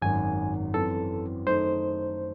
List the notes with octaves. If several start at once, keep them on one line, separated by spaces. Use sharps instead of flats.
G#1 F#2 D#3 G#5
F#2 E3 C4 A4
F#2 D#3 A3 D#4 C5